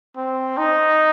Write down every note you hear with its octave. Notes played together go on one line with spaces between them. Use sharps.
C4
D#4